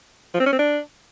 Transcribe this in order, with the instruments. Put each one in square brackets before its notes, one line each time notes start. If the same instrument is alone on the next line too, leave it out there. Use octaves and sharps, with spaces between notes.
[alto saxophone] F3
C4
C#4
C4
D4